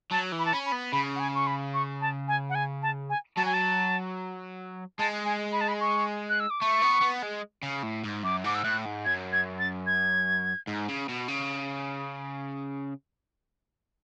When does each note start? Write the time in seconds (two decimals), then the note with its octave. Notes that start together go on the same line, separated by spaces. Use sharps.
0.11 F#3 A5
0.32 E3
0.39 B5
0.46 A5
0.52 C#4 B5
0.66 B5
0.72 B3
0.92 C#3 B5
1.16 F#5
1.20 G#5
1.35 C#6
1.47 B5
1.74 C#6
2.01 A5
2.28 G#5
2.50 F#5
2.55 G#5
2.82 A5
3.10 G#5
3.36 F#3 A5
3.45 G#5
3.54 A5
4.99 G#3 A5
5.25 G#5
5.53 B5
5.61 A5
5.68 B5
5.80 C#6
6.29 F#6
6.40 E6
6.50 D6
6.61 A3 C#6
6.82 B3
7.01 B3
7.23 G#3
7.63 C#3
7.83 A2
8.04 G#2
8.23 F#2 D6
8.44 G#2 D6
8.55 E6
8.64 A2 F#6
8.85 G#2
9.05 F#2 G#6
9.33 G#6
9.59 A6
9.87 G#6
10.67 G#2
10.89 C#3
11.09 B2
11.28 C#3